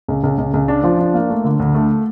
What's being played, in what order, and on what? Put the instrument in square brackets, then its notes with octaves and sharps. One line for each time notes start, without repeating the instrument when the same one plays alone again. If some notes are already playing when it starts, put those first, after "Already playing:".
[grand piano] C#2
C#2
C#2
C#2
D4
F3
D4
A#3
A3
D3
D2
A3